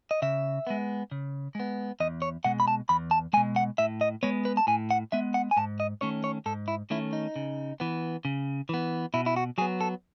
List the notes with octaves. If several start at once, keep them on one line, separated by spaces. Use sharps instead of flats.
D#5
C#3 E5
G#3 B3
C#3
G#3 B3
E2 D#5
C#5
B2 G#3 F#5
B5
A5
E2 B5
A5
B2 G#3 G#5
F#5
A2 E5
D#5
G#3 B3 C#5
B4
A5
A2 G#5
F#5
G#3 B3 E5
F#5
G#5
G#2 A5
D#5
D#3 A3 C#4 C#5
C#5
G#2 A4
E4
D#3 A3 C#4 E4
D#4
C#3
E3 B3
C#3
E3 B3
B2 E4
E4
F#4
F#3 B3 G#4
A4